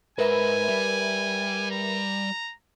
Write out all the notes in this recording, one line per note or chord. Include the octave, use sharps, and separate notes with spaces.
G#2 A#4 B4 E5 G#5 B5
G3
A#5